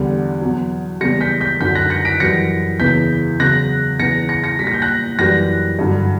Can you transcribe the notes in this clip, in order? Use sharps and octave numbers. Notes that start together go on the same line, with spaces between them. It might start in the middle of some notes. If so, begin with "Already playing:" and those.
Already playing: E2 D3 G3
E2 B2 F#3
E2 C#3 G3 A#6 C#7
G6 B6
G6 B6
F#2 D3 F#3 G6 B6
F#6 A#6
A#6 C#7
B6 D7
F#2 E3 G3 A#6 C#7
E2 C#3 E3 G6 B6
E2 C#3 F#3 F#6 A#6
E2 C#3 E3 A#6 C#7
A#6 C#7
A#6 C#7
A#2 G3 A#6 B6
G6
F#6 A#6
F#2 E3 G3 F#6 A#6
G2 D3 F#3